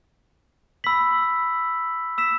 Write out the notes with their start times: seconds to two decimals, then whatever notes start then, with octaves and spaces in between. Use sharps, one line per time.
0.84 B5 E6 B6 F#7
2.18 E6 B6 E7